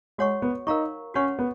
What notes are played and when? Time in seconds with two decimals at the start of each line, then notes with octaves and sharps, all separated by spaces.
0.18 G#3 F#4 C#5 F#5 C#6
0.42 B3
0.67 D#4 A#4 F5 A#5 C#6
1.14 C#4 F#4 C#5 F#5 C#6
1.39 B3